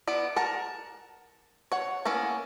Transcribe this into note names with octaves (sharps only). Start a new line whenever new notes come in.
B3 E4 D5
A#4 F#5 A5
C#5 F#5
A#3 B3 C#4 E4